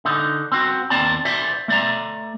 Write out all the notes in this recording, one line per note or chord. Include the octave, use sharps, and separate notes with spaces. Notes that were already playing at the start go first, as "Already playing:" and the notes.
D3 D#4
C4 F#4
D#2 C4 D5 A5 A#5
C5 D5 E5
A3 D5 A#5